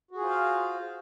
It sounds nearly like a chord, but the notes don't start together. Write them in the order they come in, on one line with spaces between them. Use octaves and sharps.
F#4 G#4 F4 C5 F5